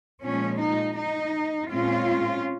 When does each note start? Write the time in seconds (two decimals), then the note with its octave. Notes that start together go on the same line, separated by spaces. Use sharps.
0.22 A#2 F3 G#3 C#4
0.60 D#4
0.96 D#4
1.70 A#2 G#3 C4 C#4 F4